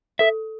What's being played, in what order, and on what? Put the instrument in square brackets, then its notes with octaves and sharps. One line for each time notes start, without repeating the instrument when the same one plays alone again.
[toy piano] A4 [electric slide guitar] E5